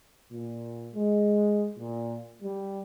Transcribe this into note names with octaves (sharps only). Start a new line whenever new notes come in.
A#2
G#3
A#2
G3